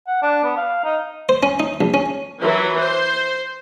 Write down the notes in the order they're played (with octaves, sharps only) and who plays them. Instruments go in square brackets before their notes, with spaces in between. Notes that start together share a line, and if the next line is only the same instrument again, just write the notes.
[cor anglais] F#5
D4
B3
F5
D#4
[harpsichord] C5
C#4
D#4
A#1
C#4
[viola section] E3 F#3
C5